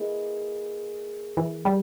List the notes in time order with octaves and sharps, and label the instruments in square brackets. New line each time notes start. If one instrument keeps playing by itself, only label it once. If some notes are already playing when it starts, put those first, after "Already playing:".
Already playing: [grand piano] A#3 E4 G#4 B4 D#5
[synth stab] E3
G3